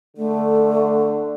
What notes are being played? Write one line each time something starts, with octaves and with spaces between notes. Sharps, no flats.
D3 A3